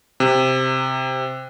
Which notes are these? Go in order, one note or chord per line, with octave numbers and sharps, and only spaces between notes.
C3